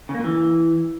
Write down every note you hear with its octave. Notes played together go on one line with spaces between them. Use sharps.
C#3
A#3
A#2
E3